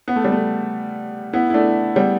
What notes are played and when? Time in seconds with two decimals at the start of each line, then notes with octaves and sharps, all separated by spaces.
0.08 B3
0.16 A3
0.24 G3
0.32 A3
1.33 B3 E4
1.50 E4
1.54 A3 D4
1.96 G3 B3